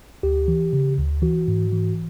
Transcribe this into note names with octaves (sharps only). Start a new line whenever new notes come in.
D2 G4
E3
C#3
D2
E3 F#4
G#2
E3